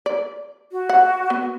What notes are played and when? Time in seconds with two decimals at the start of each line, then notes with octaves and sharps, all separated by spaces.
0.06 D5
0.72 F#4
0.89 F#5
1.30 B3